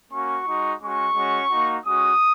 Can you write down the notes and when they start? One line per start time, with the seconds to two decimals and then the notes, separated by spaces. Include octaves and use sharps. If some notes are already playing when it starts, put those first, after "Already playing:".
0.11 A#3 C#4 F#4 C#6
0.46 G#3 D#4 F#4
0.80 G#3 C#4 F#4 C#6
1.15 G#3 C#4 F#4
1.50 A#3 D#4 F#4
1.84 G#3 C#4 F#4 D#6